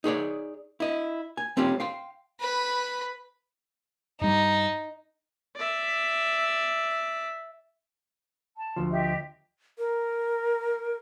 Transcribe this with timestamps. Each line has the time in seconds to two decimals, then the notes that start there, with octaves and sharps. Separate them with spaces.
0.04 D#4 G#4 C#5 D5
0.80 E4 D#5
1.37 G#5
1.57 A3 C4 C#4 F4 G4
1.80 F5 G5 C6
2.40 B4 B5
4.21 G2 G3 D#4
5.56 D5 E5
8.56 A5
8.76 D2 F3
8.91 G4 D#5 E5
9.78 A#4